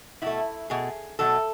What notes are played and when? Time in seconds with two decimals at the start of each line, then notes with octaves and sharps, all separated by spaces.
0.22 B2 A3 E4
0.70 B2 A3 G#4
1.19 B2 F#3 A3 A4